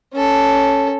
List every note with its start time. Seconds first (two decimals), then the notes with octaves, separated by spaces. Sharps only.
0.13 C#4 A4